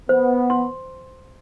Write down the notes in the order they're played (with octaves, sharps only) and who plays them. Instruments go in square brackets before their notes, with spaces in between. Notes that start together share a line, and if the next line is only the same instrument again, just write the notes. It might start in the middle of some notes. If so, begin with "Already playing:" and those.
[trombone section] B3 [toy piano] C5
[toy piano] C6